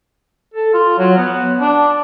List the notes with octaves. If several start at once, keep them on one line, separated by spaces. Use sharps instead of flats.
A4
F4
F#3
B3
D4